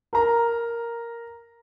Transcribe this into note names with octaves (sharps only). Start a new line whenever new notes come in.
A#4 A#5